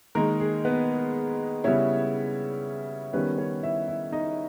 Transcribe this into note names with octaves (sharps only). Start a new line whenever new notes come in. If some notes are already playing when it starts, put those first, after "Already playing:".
D#3 G#3 A#3 D#4 A#4
G#4
B3 B4
C#3 G3 B3 C#4 E4 C#5
D#3 G3 B3 C#4 B4
C#4 C#5
E4 E5
E4 E5
D#4 D#5